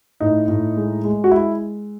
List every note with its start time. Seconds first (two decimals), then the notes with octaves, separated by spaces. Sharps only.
0.20 A2 D#4
0.48 A2
0.77 G#3
1.04 G#3
1.24 F#4
1.31 G#3 E4